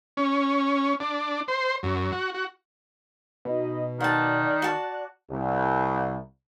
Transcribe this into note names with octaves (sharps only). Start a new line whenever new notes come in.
C#4
D4
C5
F#2
F#4
F#4
B2 D#4 D#5 B5
D#3 D5 F#5 A5 F#6
F#4 A5
C2